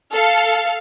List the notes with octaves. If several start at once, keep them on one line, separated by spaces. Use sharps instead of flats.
A4 F5